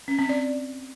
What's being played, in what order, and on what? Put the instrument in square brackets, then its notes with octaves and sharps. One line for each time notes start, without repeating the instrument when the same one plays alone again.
[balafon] C#4
C4
D5